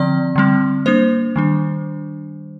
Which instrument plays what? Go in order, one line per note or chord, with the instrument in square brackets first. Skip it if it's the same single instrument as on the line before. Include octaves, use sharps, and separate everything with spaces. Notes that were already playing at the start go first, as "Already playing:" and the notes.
Already playing: [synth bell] D3 F3 C4 D5
D3 G3 C4
G3 A#3 D4 C5
D#3 G3 D4